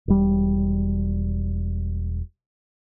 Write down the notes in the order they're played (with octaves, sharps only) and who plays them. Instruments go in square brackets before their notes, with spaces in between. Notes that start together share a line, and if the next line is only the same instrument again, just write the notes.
[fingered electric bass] E1 G3